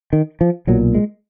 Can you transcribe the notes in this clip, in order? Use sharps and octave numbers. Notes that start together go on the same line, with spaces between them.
D#3
F3
B1 A#2 F#3
G#3